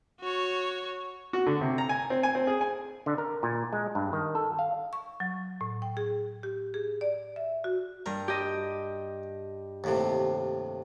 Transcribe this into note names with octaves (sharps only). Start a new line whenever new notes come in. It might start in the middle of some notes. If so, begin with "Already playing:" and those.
F#4 C#5
F#4
D3
C3
A#5
G#5
C4
G#5
C4
G#4
G#5
D3
A#4
A#2
G#3
G2
D#3
A4
F5
C#6
F#3
A2
G5
G#4
G4
G#4
D5
E5
F#4
G2 A#4
G4 D#5
D#2 A2 C3